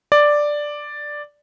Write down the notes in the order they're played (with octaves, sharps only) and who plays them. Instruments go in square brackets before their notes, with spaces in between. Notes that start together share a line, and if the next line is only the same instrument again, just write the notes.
[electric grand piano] D5